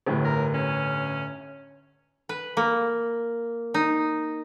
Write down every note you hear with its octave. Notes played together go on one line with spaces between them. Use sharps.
G1 A2
A#4
C#4
B4
A#3
D#4